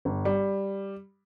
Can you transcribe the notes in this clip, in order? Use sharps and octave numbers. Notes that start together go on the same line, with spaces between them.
G1
G3